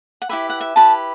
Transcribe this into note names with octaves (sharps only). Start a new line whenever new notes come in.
F#5
E4 G4 B4 E5
F#5
E5
E4 G4 B4 A5